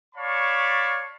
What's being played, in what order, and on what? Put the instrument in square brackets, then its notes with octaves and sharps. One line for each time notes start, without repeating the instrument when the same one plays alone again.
[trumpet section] C#5 D5 F5 A5 B5 C#6